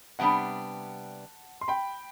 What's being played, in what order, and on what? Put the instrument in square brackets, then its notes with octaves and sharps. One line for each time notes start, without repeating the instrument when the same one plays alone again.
[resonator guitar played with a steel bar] C3 G3 B3 D4 [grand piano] F#5 A5
[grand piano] C6
G5 B5